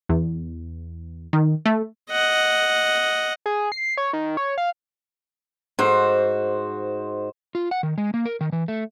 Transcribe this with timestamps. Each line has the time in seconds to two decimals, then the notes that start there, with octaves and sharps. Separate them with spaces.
0.09 E2
1.33 D#3
1.65 A3
2.11 D#5 F#5
3.46 G#4
3.72 C7
3.97 C#5
4.13 D#3
4.37 C#5
4.58 F5
5.79 G#2 F#4 C5
7.55 F4
7.71 F#5
7.83 D#3
7.98 G#3
8.14 A#3
8.26 A#4
8.41 D#3
8.52 E3
8.68 A3